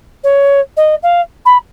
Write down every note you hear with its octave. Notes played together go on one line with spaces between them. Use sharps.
C#5
D#5
F5
B5